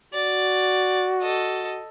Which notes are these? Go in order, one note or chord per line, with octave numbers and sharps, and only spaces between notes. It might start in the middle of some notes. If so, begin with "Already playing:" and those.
F#4 D5
A4 D#5